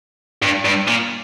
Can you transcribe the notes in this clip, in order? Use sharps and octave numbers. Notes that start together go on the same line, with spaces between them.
G2
G2
A#2